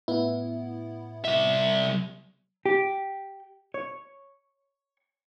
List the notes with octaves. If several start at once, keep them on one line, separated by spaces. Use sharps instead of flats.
A2 B3 E4
C2 E5
G4
C#5